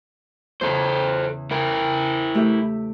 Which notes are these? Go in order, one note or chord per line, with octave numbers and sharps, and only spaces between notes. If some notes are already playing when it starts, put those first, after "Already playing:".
E2 C#3 A4 C5
E4 A#4 G#5
A3 G4 E5